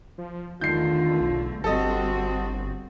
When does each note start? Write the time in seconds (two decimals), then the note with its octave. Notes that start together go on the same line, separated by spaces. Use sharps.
0.18 F3
0.61 E2 D3 D#3 A3 F4 G6 C7
1.21 B1
1.64 G1 G3 C4 F#4 G4 A4 D#5